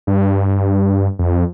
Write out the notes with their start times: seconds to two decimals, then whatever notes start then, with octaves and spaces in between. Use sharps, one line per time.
0.07 G2
1.19 F2